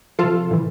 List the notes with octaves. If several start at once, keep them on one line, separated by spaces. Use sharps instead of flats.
C3 F3 F4 A4
A2 E3